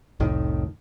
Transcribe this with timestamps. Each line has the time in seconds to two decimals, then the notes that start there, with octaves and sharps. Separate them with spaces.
0.20 F1 C2 A2 D#3